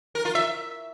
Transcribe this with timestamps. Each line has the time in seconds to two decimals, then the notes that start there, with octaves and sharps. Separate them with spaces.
0.15 A#4
0.25 F4
0.35 E5